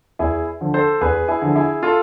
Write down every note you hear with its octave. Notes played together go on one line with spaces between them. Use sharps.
E2 E4 G#4
D3 F3
A4 C5
E2 G#4 B4
E4 G#4
D3 F3
E4 G#4
F4 A4